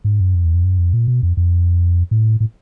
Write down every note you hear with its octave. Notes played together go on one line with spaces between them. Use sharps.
G#2
F#2
F2
E2
F2
F#2
F2
A#2
B2
F2
F2
A2
A2